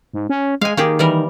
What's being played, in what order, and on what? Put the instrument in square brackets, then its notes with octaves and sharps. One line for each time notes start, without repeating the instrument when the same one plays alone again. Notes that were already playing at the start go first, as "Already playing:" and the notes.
[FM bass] G#2
C#4
[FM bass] G#3 [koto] F5 G#5
[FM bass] D#3 [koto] A#3 G4 G#4
[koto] E3 G3 A#4